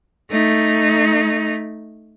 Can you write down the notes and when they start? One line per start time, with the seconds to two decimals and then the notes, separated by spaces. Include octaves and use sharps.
0.31 A3 D#4